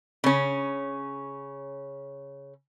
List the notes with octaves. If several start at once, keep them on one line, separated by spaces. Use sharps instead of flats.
C#3 C#4